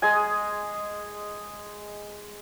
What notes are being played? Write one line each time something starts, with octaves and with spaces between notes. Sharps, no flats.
G#3 G#4 D#5 G#5